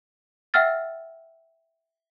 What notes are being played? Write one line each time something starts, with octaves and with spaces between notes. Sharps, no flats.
E5 F#5 G5 E6 F6 A6